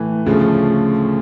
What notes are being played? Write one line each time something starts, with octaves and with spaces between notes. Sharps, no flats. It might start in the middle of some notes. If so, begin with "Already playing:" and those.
Already playing: A2 E3 A3
D2 C#3 F3 A3